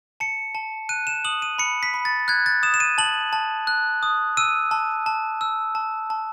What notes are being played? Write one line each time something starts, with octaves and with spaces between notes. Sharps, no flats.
A5 C#7
A5
F#6 D#7
E7
D#6 F#7
D#7
B5 C#7
B6
B5
A6
F#6 G#6
A6
D#6 E7
E7
D#7
A5 F#7
A5
F#6
D#6
E6 D#7
A5
A5
E6
A5
A5